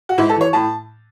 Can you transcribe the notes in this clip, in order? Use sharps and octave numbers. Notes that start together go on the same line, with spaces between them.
F#4
G#2 E4
A4
E3 C#5
A2 A5